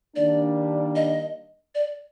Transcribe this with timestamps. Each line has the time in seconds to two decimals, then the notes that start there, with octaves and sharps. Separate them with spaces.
0.16 D#3 G3 A#3 D4 D5
0.96 D#5
1.75 D5